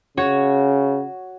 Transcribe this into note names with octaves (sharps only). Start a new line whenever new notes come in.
C#3 F#4 C#5